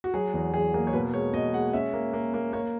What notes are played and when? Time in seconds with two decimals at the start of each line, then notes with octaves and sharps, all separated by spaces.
0.04 F#4
0.14 F#3 G#4
0.34 E2
0.53 F#3 G#4
0.74 A#3 G#4
0.87 C#5
0.93 B2 B4
1.13 G#3 C#5
1.34 B2 D#5
1.53 G#3 F#5
1.73 C#4 E5
1.93 A#3
2.13 A#3
2.34 A#3
2.53 A#3 C#5